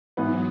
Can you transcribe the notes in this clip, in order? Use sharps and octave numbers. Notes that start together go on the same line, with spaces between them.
G#2 E3 F#3 B3